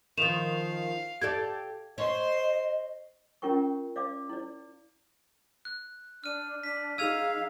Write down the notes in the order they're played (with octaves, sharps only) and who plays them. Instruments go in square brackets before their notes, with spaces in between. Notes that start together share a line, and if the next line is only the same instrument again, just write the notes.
[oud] D#3 F3 [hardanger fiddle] F5 [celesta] E7 F7
[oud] G4 A4 D5 [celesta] G#6
[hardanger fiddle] C5 C6 [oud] C#5 [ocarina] D#5
[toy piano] C#4 F4 A#4 G5 C#6
D5 F5 D6
E4 D5
[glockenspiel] F#6
[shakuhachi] D4 [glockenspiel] F6 D#7
[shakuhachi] D4 [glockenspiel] B6
[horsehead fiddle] D#4 [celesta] G#4 F6 D#7 [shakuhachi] F5 [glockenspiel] E6 G#6 F7